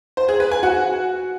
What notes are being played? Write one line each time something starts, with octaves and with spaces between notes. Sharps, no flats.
C5
G#4
B4
G#5
F#4